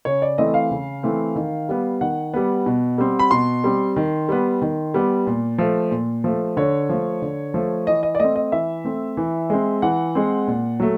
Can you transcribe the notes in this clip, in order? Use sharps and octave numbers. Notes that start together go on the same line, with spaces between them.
C#3 C#5
D5
E3 A3 C4 D#5
F5
C#3
E3 A3 C4
D#3
G3 B3
D#3 F#5
G3 B3
B2
G3 C4
B5
B2 C6
G3 C4
D#3
G3 B3
D#3
G3 B3
A#2
F3 A3
A#2
F3 A3
D3 C#5
F3 A3
D3
F3 A3
E3 D#5
D#5
D5
A3 C4 D#5
D#5
E3 E5
A3 C4
E3
G#3 C4
E3 F#5
G#3 C4
A#2
F#3 A3